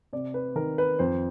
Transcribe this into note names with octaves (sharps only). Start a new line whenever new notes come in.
C3 D5
B4
D#3 A#4
B4
F2 C5